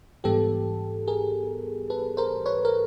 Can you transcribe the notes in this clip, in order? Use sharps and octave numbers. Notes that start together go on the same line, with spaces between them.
G#2 E3 G3 B3 G4 A4
G#4 A#4
A4 B4
A#4 C5
B4 C#5
A#4